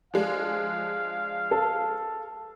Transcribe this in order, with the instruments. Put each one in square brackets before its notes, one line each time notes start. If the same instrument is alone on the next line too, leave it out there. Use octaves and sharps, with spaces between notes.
[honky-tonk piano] F3 G#3 D4 [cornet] F5
[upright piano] A4